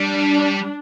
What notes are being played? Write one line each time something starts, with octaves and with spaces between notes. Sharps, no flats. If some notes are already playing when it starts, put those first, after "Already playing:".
Already playing: G3 D4